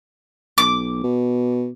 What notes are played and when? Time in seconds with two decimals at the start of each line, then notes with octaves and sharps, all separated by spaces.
0.58 B1 D6
1.04 B2